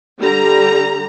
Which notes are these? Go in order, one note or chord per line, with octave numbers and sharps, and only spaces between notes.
D3 G3 A#5